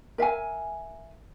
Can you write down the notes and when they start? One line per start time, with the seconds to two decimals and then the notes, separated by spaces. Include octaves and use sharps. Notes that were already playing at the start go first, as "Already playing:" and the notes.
0.18 A#4 E5 F5 G#5